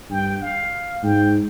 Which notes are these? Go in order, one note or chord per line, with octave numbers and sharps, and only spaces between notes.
G2 G5
F5
G#2 G5